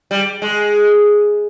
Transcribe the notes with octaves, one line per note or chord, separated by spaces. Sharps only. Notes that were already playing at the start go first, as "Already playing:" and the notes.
G3
G#3